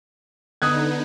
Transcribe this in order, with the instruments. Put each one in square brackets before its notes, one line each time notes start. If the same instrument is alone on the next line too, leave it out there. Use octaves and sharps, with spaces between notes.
[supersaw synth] D3 B3 D#4 [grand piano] D#6 F#6 G#6